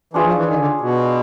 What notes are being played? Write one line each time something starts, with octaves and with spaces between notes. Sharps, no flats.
E3 D4 F4 G#4 C#5
F3
E3
D#3
D3
B2